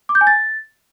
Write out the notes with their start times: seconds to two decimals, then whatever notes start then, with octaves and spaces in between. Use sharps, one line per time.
0.09 D6
0.15 G6
0.21 G#5
0.27 A6